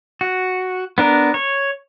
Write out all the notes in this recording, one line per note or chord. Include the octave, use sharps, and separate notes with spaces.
F#4
B3 D4 A#4
C#5